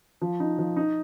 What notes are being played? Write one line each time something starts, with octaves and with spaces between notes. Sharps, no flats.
F3
D#4
F3
D#4